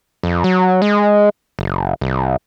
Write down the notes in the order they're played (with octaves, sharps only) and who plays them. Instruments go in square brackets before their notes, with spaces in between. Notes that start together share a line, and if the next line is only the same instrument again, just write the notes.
[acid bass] F2
F#3
G#3
F#1
C2